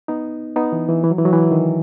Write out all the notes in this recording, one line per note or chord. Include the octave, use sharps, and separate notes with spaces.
B3 D#4
B3 D#4
E3
E3
E3
F#3
E3
F#3
E3
D#3